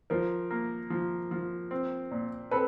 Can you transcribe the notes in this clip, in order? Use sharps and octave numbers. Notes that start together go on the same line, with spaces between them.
F3 A#4 C5
A#3
F3
F3
C4
A#2
C4 A4 B4